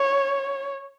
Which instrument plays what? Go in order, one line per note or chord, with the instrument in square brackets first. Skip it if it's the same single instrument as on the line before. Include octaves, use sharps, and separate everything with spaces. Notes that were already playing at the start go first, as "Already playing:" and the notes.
Already playing: [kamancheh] C#5